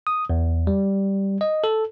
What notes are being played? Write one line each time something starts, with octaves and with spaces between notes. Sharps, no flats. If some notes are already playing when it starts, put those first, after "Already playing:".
D#6
E2
G3
D#5
A4